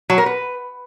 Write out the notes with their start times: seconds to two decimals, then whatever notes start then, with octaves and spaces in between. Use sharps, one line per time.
0.10 F#3
0.18 A#4
0.26 B4